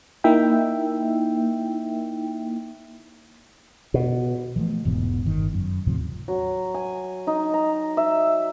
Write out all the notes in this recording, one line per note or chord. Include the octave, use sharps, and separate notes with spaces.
A#3 D#4 E4 E5 G5
B2
E3 F3 A3
E1 G#2 E3 B3
G1 D#3
F#2
D#2 A2 C3 F3
F#3
G#5
D#4
A#5
E5